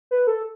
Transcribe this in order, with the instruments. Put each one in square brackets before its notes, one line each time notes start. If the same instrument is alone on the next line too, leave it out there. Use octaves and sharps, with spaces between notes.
[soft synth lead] B4
A4